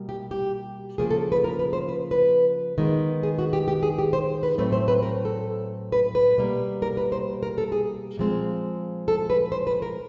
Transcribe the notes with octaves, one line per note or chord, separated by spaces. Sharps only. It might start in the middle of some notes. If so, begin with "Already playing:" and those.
Already playing: B2 G3 A#3
G4
G4
C#3 F3 A#3 G#4
A4
B4
A#4
B4
C5
B4
B4
D#3 G#3 B3
G#4
F#4
G4
G4
G#4
G4
C5
B4
A2 F#3 A3 C4 B4
C5
B4
A#4
A4
B4
B4
B2 G3 A#3
A#4
B4
C5
A#4
A4
G#4
A#2 F3 G#3 C4
A4
B4
C5
B4
A#4